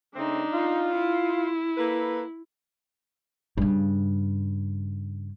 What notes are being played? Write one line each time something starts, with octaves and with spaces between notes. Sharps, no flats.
C#3 A3 C4 D4 D#4
F4
E4
A#3 A4 B4
G2 C#3